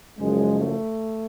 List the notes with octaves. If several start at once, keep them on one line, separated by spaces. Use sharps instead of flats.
F#1 F#2 C#3 F3 G#3
A3